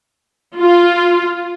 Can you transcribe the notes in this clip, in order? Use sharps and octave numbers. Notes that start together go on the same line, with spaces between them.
F4